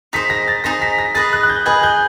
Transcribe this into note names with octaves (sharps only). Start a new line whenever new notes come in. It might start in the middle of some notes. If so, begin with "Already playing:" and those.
D#4 G#4 C5 B6
A#6
A6
D#4 G#4 C5 A#6
B6
A#6
G#4 B4 D#5 A6
F#6
F#6
G6
G#4 B4 D#5 G#6
G6